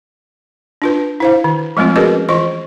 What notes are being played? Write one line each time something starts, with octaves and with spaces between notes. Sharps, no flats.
D4 F4 B4
E4 C5 F5
D#3
F3 G#3 A3 C4 F4
C#4 F#4 G#4 A#4 B4 D#5
E3 F4 D#5 C#6